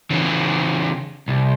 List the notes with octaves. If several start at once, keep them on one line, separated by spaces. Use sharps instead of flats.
C#3 E3
C2